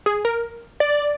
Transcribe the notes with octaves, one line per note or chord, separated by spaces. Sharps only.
G#4
A#4
D5